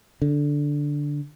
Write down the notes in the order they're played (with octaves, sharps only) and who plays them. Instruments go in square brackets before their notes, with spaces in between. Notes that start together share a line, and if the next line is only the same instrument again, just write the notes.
[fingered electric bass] D3